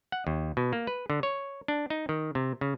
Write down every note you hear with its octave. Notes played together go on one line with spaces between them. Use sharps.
F#5
D#2
B2
A#3
B4
D3
C#5
D4
D#4
D#3
C3
C#3